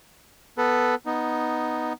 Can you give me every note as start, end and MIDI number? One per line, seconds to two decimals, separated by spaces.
0.58 0.95 59
0.58 0.95 69
0.58 0.95 71
1.06 1.93 59
1.06 1.93 63